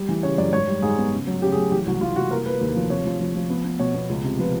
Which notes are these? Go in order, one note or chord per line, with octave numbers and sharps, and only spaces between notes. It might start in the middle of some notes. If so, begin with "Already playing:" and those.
Already playing: G3
E3
C#3 C#5
F#2 D5
G#2 C#5
G3
G#2 G#4
B3
C#3
F#3
C#3 G4
G#4
F#3
E3 G4
C2 F#4
C2 F4
C2 F#4
A#3 A#4
A#3 B4
D#2
F3
C3 C#5
F3
F3
F3
B3
B3
B2 C#5
B3
C#2
C3
F3 B4